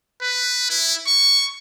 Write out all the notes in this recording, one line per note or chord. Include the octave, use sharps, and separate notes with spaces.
B4
E4
C#6